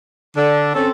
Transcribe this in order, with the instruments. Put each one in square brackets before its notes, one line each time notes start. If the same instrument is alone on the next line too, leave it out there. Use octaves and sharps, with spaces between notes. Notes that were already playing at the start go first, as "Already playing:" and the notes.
[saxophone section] D3 [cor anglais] D4
[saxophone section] C4 C#4 [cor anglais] A4